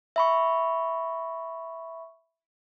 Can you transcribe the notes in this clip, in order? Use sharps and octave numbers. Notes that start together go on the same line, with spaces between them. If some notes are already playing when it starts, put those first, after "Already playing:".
E5 B5 C#6